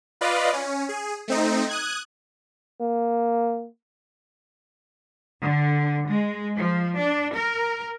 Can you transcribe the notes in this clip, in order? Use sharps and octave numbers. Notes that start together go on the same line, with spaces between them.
F4 B4 D5 D#5 F5
C#4
G#4
A3 C4 D#4
D#6 F#6 G#6
A#3
D3
G#3
F3
D4
A#4